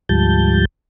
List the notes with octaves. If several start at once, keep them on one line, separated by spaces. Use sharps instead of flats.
D2 G#2 F3 G3 A5 G6